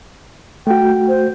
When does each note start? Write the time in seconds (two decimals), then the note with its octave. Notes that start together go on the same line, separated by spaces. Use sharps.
0.67 A3 F#4 G5
1.08 C5